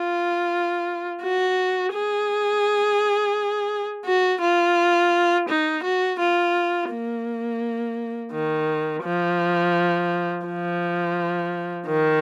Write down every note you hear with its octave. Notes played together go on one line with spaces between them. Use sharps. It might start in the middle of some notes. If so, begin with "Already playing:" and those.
Already playing: F4
F#4
G#4
F#4
F4
D#4
F#4
F4
A#3
D#3
F3
F3
D#3